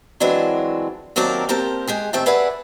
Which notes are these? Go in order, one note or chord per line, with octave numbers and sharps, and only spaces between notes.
E3 F#3 G#3 C4 D4 C#5
D#2 F#3 C4 A#4 D5 A5
A#3 C4 G4 A#4 C5 A5
G#3 G4 G#4
A2 D#3 C4 E5 G5 A5
G#4 B4 D5 E5 F#5 G#5